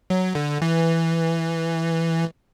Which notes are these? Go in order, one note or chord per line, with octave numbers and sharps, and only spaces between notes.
F#3
D3
E3